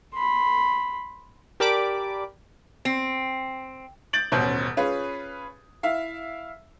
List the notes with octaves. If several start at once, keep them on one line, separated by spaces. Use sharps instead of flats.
B5 C6
G4 A#4 D5 A5 B5 D6
C4
G6 A6 D7 F#7
D#1 A1 B2 C#4 C5 G6
C#4 F4 G#4 B4
E4 E5 F5